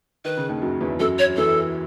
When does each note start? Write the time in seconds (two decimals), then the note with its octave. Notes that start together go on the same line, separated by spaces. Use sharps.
0.25 D#3 B4
0.37 C#3
0.49 D#2 D#3
0.62 F#2 F#3
0.81 E2 E3
0.99 F#2 F#3 A4
1.19 C#5
1.28 F#3
1.36 E2 E3 A4